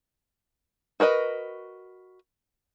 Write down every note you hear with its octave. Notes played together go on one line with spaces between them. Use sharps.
F#4 A#4 B4 D#5